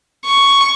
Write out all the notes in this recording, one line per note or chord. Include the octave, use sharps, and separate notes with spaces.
C#6